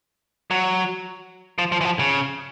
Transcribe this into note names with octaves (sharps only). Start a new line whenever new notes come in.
F#3
F3
F3
E3
F3
C#3